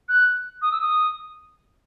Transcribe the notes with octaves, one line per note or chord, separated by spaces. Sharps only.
F#6
D#6
E6
D#6